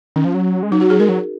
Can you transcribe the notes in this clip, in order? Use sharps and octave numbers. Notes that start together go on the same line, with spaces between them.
D#3 C#4
F3
F#3
G#3
F#3 D#4
F#4
G#4
G#3 A#4
F#3